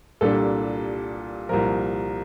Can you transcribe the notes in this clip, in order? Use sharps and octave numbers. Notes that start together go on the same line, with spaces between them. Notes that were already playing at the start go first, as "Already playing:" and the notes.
C2 A#2 G3 D4 A4
C2 A#2 F3 A#4